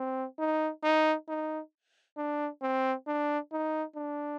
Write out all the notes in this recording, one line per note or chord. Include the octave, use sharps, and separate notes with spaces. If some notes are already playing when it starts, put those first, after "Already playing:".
Already playing: C4
D#4
D#4
D#4
D4
C4
D4
D#4
D4